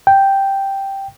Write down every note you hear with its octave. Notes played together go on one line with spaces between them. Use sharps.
G5